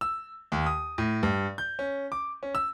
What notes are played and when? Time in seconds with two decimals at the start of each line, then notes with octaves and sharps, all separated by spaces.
0.01 E6
0.52 D#2
0.66 D#6
0.98 A2
1.23 G2
1.58 G6
1.79 C#4
2.12 D6
2.43 C#4
2.55 E6